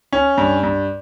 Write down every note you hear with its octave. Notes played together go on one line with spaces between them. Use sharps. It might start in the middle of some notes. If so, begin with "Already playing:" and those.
C#4
G2
G2